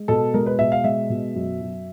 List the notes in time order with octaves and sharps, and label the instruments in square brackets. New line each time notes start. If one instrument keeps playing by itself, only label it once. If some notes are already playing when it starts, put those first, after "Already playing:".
Already playing: [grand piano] G#3
B2 A4
G#3 A#4
B4
B2 E5
F5
G#3 E5
B2
F#2
F#2